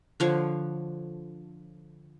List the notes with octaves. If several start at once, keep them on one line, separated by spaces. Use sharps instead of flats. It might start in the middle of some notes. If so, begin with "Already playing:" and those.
D3 F3 C#5